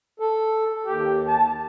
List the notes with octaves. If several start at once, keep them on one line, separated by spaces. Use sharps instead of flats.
A4
D#2 G4
A5